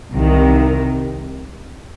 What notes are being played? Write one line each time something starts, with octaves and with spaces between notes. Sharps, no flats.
C2 C3 D#3